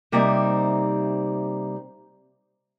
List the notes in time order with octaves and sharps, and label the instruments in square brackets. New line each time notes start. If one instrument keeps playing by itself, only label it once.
[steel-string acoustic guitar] C3 G3 A#3 C4 D#4 E5